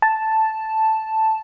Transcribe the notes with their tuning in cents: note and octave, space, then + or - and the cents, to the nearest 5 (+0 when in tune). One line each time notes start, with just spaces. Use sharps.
A5 +0